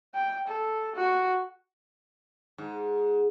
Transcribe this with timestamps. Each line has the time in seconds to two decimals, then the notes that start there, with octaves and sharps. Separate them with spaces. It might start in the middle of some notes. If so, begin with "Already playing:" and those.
0.15 G5
0.48 A4
0.96 F#4
2.58 G#2